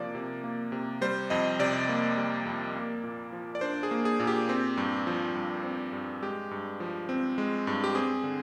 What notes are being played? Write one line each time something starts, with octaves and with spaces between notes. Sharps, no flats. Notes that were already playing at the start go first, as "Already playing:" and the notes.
Already playing: C3 F3 A#3 D5
C3
A#3
C3
G3 C5
F2 D#5
C3 D5
A#3
G3
F2
A#3
A#2
F3
D5
D4 C5
G#4
A#3
G#4
A#2
G4
C4
G2
F3
G2
C4
G2
G#3 G4
G2
F3
C4
G#3
G2
G4
C4 G#4
D3